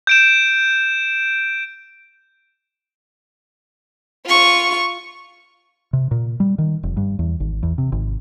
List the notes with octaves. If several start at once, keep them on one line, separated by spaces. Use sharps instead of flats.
G6 D7 E7
F4 C#6
C3
A#2
G3
D#3
F1
G2
E2
G#1
E2
C3
G#1